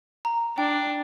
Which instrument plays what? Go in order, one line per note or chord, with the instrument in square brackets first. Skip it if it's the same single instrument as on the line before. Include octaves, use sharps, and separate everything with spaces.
[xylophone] A#5
[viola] D4 [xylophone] G5